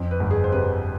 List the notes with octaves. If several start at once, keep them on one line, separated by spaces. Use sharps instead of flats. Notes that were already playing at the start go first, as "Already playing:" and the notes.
Already playing: F2
B4
G1
G#4
C5
C3 B4